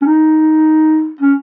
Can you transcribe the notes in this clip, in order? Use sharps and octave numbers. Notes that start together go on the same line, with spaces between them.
C#4
D#4
C#4